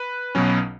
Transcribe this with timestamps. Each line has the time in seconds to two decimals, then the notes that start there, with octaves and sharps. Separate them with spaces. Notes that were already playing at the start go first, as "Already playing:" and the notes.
Already playing: B4
0.35 B1 B2 F#3 C#4